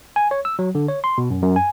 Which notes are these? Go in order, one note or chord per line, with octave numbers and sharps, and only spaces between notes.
G#5
C#5
E6
F#3
D3
C#5
C6
B2
F#2
F#2
G#5